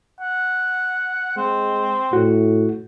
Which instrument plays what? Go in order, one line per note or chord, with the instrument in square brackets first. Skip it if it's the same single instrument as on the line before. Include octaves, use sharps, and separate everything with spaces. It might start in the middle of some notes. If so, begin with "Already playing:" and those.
[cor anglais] F#5
[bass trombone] G#3 [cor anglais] C4
[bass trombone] A2 [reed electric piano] F#4